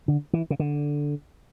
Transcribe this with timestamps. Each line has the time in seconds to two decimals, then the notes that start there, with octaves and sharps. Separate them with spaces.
0.08 D3
0.33 E3
0.50 C#3
0.60 D3